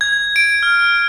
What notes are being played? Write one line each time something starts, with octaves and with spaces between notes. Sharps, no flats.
G#6
D7
F6